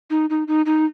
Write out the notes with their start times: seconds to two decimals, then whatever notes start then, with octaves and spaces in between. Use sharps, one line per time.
0.10 D#4
0.30 D#4
0.48 D#4
0.66 D#4